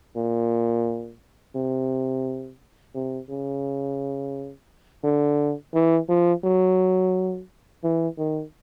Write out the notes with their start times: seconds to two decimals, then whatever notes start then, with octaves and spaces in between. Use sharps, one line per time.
0.16 A#2
1.56 C3
2.95 C3
3.30 C#3
5.04 D3
5.74 E3
6.09 F3
6.44 F#3
7.84 E3
8.18 D#3